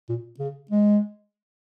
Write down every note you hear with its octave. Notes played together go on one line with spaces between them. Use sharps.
A#2
C#3
G#3